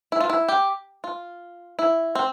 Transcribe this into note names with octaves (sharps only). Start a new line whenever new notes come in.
E4
F4
E4
G4
F4
E4
C4